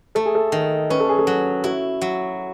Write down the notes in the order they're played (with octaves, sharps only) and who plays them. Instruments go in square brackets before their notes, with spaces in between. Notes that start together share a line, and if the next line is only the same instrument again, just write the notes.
[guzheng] A3 [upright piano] A4
[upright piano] G#4
A4
[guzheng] D#3
[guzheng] C#4 [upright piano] B4
[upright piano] A4
G#4
A4
[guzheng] F#3
[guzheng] E4 [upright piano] F#4
[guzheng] F#3